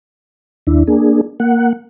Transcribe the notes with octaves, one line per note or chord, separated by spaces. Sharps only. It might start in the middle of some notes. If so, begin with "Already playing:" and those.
D#2 D4 E4
A#3 D4 G#4
A#3 F#5